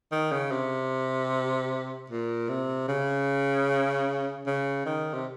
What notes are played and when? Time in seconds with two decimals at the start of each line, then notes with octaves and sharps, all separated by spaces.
0.12 D#3
0.32 C#3
0.52 C3
2.10 A#2
2.49 C3
2.88 C#3
4.47 C#3
4.86 D#3
5.14 C3